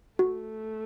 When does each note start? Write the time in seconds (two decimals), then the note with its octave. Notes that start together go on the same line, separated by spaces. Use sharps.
0.19 A3 F#4